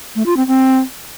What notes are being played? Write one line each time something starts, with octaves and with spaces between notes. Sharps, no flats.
A3
F4
C4
C4